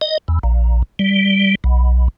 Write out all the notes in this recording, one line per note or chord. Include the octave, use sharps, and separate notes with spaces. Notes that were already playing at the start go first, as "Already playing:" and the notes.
D#5
E2
A#1
G3
B1